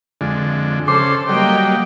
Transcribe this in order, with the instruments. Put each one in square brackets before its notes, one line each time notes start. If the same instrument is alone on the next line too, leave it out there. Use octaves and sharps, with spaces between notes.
[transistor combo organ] F2 D3 G#3
[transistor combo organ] C#3 C5 C6 [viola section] A4 [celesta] D6
[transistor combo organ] F#3 G3 [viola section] A#3 D#5 G5